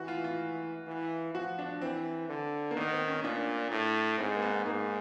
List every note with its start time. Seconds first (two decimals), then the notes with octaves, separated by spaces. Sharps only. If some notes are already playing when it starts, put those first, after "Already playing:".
Already playing: E3 F#4
0.08 F4
0.24 F4
0.87 E3
1.34 F3 F#4
1.59 D4
1.81 E3 C4
2.29 D3
2.71 A#3
2.76 D#3 B3
2.92 C4
3.08 C#4
3.24 A#2 D4
3.71 A2
4.18 G#2 C4
4.36 A#3
4.42 B3
4.66 G#2 A#3